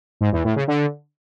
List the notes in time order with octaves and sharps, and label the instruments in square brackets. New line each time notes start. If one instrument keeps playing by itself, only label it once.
[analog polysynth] G#2
E2
A2
C#3
D3